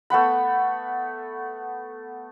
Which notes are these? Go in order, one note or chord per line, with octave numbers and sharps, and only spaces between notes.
A3 B3 F#5 B5